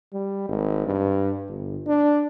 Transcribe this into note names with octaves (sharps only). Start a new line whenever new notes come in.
G3
G#1
G2
G1
D4